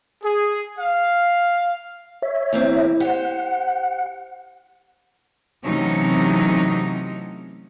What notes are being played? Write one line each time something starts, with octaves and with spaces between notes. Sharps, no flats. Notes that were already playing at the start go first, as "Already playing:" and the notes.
G#4
F5
C#5 E5
E2 A#3 C4
G4 C5 F#5
C3 E3 F#3 A3 C#4 D#4